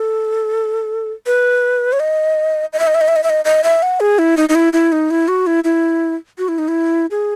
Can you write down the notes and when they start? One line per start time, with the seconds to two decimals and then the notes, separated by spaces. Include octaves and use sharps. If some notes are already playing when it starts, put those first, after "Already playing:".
Already playing: A4
1.26 B4
1.93 C#5
2.00 D#5
2.73 D#5
2.80 E5
2.87 D#5
2.95 E5
3.01 D#5
3.08 E5
3.16 D#5
3.24 E5
3.30 D#5
3.45 D#5
3.64 E5
3.83 F#5
4.00 G#4
4.19 E4
4.37 D#4
4.49 D#4
4.55 E4
4.73 E4
4.92 D#4
5.11 E4
5.28 F#4
5.47 E4
5.64 E4
6.38 F#4
6.48 E4
6.58 D#4
6.68 E4
7.11 G#4